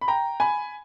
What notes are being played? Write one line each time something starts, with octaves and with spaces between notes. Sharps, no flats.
B5
G5 A#5
G#5 B5